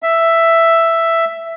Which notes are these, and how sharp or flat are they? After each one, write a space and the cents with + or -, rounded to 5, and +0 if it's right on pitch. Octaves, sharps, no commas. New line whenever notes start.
E5 +5